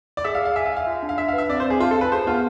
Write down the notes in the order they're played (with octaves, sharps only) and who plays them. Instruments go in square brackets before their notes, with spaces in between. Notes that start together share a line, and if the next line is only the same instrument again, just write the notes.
[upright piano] D5
[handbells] G#4 [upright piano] E5
[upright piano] F5
[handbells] D5
[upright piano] F5
[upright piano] E5 [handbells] G#5
[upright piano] F5
[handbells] E5
[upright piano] F5
[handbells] F4
D4
[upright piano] F5
[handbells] D4 [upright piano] E5
[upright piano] F5
[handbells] B4
[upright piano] E5
[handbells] C4 [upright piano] D5
[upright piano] C5
[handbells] C4
[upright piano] G#4
[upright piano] F4 [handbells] A5
[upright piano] A4
[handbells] A5
[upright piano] B4
[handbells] G#4 [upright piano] C5
[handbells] B3 [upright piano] F4